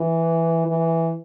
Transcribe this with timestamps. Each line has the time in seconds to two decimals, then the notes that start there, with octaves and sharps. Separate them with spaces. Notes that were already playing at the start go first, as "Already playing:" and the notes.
Already playing: E3
0.67 E3